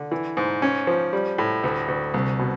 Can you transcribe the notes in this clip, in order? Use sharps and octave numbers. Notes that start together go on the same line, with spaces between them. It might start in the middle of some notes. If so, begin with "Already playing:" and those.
Already playing: D3
E3
G#2
C#4
F3
G3
A2
D2
D2
C2
B2